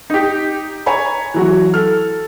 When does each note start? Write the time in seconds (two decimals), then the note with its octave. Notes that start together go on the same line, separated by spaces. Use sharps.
0.10 D#4 G4
0.86 C#5 G#5 A#5 B5
1.34 E3 F#3 F#4
1.74 A4 F6